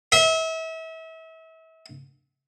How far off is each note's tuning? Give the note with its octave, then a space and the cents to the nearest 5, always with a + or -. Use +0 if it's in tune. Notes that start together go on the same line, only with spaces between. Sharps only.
E5 -35